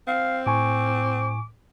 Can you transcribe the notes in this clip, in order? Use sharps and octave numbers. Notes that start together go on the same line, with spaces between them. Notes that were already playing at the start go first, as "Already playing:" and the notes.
C4 F5
A2 G#5 C#6 D6